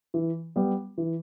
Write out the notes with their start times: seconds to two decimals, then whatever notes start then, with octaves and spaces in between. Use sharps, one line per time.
0.14 E3
0.56 G3 B3
0.98 E3